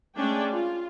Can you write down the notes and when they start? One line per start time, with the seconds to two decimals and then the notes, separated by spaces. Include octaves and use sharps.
0.17 G#3 A3 C#4 D4 D5 G5
0.51 F4